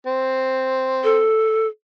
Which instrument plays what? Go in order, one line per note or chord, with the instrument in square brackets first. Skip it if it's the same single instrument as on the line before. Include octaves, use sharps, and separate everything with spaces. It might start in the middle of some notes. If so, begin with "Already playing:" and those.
[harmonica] C4
[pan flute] A4